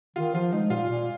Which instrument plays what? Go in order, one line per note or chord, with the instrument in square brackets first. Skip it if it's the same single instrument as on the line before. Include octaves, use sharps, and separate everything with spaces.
[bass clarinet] D#3 [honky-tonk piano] F4
[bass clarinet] F3 [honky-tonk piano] F4
[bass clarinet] G#3 [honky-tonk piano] D#4
[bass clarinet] A#2 [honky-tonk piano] F4
[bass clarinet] A#2